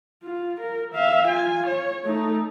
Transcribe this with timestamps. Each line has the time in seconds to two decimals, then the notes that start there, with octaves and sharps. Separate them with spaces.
0.23 F4
0.61 A#4
0.94 E5 F5
1.28 F4 G#5
1.67 C#5
2.05 A3 D#4